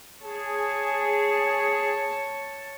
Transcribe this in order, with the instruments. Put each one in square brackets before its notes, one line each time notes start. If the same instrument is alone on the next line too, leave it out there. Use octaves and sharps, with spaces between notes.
[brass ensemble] G#4 [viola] C#5 A5